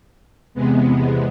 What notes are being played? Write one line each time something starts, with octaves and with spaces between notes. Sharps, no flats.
E2 C3 G#3 B3